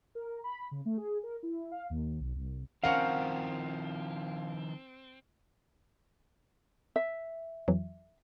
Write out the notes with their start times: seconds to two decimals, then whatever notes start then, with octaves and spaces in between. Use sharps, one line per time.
0.15 A#4
0.44 B5
0.71 C#3
0.85 A3
0.97 G#4
1.23 A#4
1.43 E4
1.71 F5
1.90 D#2
2.20 B1
2.35 C2
2.84 D#3 F3 C4 C#4 A#4 F5 F#5
6.96 E5
7.68 F2 E3 F#3